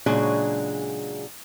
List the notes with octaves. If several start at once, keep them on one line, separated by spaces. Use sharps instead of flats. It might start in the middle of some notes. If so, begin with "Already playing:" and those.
A#2 C#3 F#3 G#3 D4 G#4